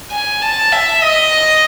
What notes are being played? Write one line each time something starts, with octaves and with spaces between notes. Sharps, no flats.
G#5
A5
E5
D#5